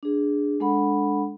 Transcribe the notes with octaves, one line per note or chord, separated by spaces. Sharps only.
D4 G#4
G#3 D4 A4 F#5 B5